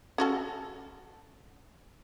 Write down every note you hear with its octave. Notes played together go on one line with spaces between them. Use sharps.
C#4 F#4 A4